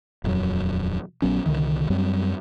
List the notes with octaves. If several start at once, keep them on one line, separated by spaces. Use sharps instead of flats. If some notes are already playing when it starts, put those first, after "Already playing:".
D#1 F2 F#3
A#1 F#3 B3 C#4
C2 F#2 D3 D#3
F#2 F#3 G3 C4